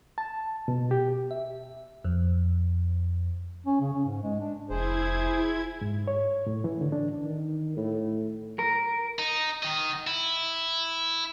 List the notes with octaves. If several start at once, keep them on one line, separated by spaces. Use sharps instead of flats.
A5
B2
G4
E5
F2
C#4
C#3
C#4
G#2
G#3
D4
F1 E4 G#4 C5 G#6
G#2
C#5
A2
E3
D3
D4
D#3
A2
A#4
D#4
D#3 D#5
E4